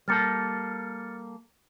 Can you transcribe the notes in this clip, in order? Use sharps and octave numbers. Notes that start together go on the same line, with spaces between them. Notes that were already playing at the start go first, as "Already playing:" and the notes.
G3 A#3 A4 F6 A6 C#7